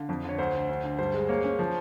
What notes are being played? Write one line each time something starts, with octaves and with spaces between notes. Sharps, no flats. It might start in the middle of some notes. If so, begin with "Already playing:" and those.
Already playing: D3 F5
F2
D3
C#5
D2 C5
D3
D2
D3
G2 C5
G#3
A#3 C#5
C#4
F3